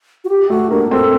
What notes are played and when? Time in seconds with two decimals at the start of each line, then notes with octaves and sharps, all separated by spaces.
0.24 F#4
0.29 G4
0.50 A3 F#4
0.70 A#3 D4
0.91 C4 A4